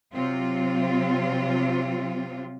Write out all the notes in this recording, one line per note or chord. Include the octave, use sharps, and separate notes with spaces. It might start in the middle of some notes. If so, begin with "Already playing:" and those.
C3 F#3 C4 F4